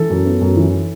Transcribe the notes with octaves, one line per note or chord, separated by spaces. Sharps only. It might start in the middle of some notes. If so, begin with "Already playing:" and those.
Already playing: E3 A4
F#2
B3
F#2
E3